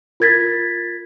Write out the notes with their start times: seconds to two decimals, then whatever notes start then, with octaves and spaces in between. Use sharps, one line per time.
0.20 F4 A#4 G#6 A6 B6